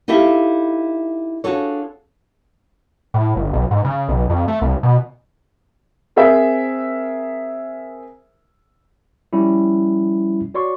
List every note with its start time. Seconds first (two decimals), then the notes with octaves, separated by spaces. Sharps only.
0.08 D#4 E4 G4 A4 E5 F5
1.44 D4 F4 F#4 G#4 A4 C#5
3.14 A2
3.36 G1
3.53 B1
3.71 G#2
3.85 C#3
4.09 B1
4.30 F2
4.48 A3
4.62 C2
4.83 B2
6.16 C4 G#4 A#4 C5 E5
9.33 F3 G3 C#4 E4
10.54 F#4 C#5 D5 C6 C#6